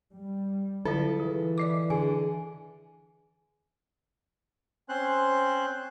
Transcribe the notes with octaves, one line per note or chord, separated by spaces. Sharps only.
G3
D3 F#3 E4 F4 A4
E3 G#4
D5 D#5 D6
D3 G#4 G#5
C4 C#4 C5 C6 F#6